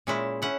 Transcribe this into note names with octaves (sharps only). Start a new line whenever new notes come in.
A#2 G#3 C#4 E4
C#4 E4 F#5